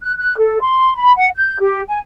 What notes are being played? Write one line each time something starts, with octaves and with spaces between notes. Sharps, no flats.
F#6
F#6
A4
C6
B5
F#5
G6
G4
G#5